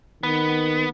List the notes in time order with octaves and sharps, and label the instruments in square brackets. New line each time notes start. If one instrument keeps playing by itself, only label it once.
[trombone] D#3 [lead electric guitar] B3